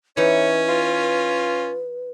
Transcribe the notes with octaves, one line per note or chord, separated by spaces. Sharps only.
E3 C#4 D#4 B4 C#5
F4